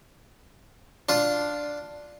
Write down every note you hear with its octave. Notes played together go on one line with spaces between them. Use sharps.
D4 F4